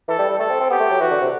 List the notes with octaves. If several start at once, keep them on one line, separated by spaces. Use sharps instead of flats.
E3 A4
G3
G3
A3 A4
C4
C4
B3 G4
A3
F#3
E3 F#4
D3
C3